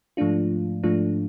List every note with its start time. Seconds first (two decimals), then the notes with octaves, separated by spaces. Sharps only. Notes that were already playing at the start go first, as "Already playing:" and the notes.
0.17 G#2 F3 A3 D4 F4
0.83 G#2 F3 A3 D4 F4